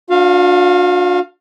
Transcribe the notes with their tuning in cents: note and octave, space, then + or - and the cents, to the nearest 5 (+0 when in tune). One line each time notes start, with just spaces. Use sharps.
D4 +0 F#4 -45 F5 +0